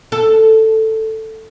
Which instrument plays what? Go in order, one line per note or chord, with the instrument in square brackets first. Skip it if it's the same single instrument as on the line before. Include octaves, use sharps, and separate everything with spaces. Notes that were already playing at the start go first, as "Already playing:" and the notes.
[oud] A4